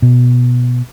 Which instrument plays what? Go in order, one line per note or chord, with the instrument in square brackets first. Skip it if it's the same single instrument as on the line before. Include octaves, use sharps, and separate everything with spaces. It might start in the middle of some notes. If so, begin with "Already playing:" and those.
[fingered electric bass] B2